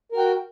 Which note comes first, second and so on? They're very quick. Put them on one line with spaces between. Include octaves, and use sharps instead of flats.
A#4 F#4 G5